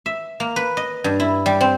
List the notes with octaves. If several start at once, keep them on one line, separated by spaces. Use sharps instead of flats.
E5
A#3
B4
D#5
G2
E4
G3
C4